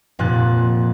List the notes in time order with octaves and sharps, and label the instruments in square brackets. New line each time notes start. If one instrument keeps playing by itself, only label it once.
[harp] F1 A#2 F#6 A6